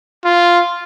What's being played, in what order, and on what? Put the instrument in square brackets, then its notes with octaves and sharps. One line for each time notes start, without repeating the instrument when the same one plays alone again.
[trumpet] F4